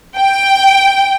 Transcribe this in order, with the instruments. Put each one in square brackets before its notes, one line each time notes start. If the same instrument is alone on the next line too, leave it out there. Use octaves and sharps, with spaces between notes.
[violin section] G5